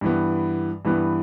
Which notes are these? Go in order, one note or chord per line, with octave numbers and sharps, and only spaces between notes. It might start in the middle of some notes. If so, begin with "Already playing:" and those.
G2 E3 B3
G2 E3 B3